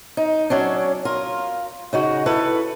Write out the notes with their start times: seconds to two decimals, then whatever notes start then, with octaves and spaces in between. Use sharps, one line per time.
0.17 D#4
0.50 F#3 C#4 D4
1.05 F4 A#4
1.93 C#3 D#4 F#4
2.26 E4 A4 B4